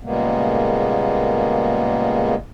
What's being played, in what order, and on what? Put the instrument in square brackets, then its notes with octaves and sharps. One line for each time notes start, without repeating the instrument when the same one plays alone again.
[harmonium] A#2 C#3 G3 G#3 A#3 B3